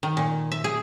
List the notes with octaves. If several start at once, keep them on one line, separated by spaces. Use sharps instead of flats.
D#3
A#2
E5
G#4